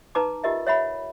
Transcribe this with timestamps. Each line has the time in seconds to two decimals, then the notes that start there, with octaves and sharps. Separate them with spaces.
0.15 D#4 B4 A5 A#5 D6
0.44 F4 G4 A#4 D#5 E5
0.67 C#5 E5 F#5 B5